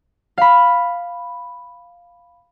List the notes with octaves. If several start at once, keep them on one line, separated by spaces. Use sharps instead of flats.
F5 B5